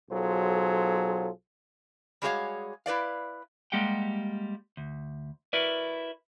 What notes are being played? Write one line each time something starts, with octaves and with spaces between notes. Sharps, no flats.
B1 F#3 F4 G#4 A4 C5
G3 G#3 F#4 G#4 C#5 F5
E4 B4 D5 F5
G3 G#3 A#3 G4 F#5 G5
D2
E4 F#4 A#4 B4 D5